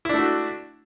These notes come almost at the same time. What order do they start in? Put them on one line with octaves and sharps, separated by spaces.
E4 D4 A3 F#4